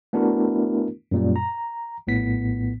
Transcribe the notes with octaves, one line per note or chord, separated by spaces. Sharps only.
A3 B3 D4 E4 F#4 A#4
F#2 A#2 G3
A#5
A#1 A2 B3 B6